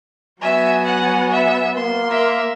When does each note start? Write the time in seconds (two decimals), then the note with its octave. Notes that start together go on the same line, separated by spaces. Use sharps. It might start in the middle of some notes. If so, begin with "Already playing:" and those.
0.41 F#3 B3 F#4 E5 G#5
0.85 F#5
1.31 E5
1.77 A#3 C6
2.10 A#4 E5